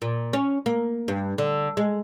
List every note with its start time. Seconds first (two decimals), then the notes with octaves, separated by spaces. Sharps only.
0.02 A#2
0.33 C#4
0.66 A#3
1.08 G2
1.38 D3
1.77 G#3